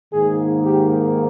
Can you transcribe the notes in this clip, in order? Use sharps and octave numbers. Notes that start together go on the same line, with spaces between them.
G#2 D#3 A#3 G#4
G4